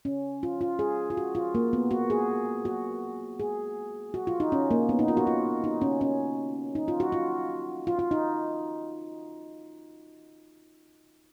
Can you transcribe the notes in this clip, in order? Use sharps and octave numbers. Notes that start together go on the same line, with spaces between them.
C#4
F4
F4
G#4
F4
F#4
F4
A#3
B3
F#4
G#4
F#4
G#4
F#4
F4
D#4
C#4
A#3
B3
D#4
F4
F#4
F4
D#4
C#4
C#4
D#4
F4
F#4
F4
F4
F4
D#4